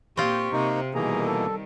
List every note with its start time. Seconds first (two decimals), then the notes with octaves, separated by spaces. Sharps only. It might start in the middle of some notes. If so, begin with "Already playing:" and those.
0.17 A#2 C4 F4 G4 C#6
0.52 C3 A#3 D#4
0.94 B2 D#3 E3 G3 A#3 G#4 A#5
1.26 A4